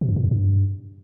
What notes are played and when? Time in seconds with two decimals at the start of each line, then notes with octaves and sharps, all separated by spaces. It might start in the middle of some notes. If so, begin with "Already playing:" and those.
0.01 B2
0.09 F#2
0.16 A#2
0.24 E2
0.31 G2